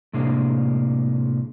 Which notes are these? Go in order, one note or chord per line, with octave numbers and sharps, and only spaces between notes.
A2 C3 G#3 A#3 D4